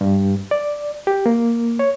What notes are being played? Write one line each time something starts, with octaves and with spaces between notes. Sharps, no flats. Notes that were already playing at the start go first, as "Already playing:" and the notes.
G2
D5
G4
A#3
C#5